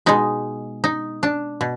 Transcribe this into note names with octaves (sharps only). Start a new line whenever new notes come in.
B2 G#3 D#4
D#4
D4
B2